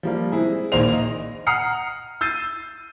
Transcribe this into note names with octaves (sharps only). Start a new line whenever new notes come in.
F3 G3 A#3
G#3 C4 E4 G#4
A#1 D#3 A#3 C5 F7
D#5
F#5 A#5 D#6 F6 C7 C#7
E6 G6 A6 C7 D#7